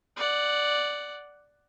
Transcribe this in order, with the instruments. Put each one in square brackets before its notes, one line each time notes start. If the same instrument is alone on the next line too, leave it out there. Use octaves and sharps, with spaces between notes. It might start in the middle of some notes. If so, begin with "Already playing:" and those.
[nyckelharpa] D5 F#5